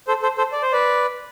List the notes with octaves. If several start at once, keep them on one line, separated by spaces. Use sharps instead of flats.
A4 C5
A4 C5
A4 C5
D5
C5
B4 D5